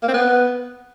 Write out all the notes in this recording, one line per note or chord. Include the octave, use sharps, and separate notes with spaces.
A#3
C4
B3